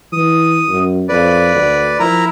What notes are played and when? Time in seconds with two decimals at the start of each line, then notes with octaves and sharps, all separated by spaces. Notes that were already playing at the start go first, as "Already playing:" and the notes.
0.12 E3 D#6
0.68 F#2
1.09 F2 B4 D5
1.55 D2
2.00 F3 E4 A#4 A#5